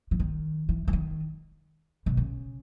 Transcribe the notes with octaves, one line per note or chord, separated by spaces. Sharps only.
E3
D#3
E3
E3
D#3
B2
C#3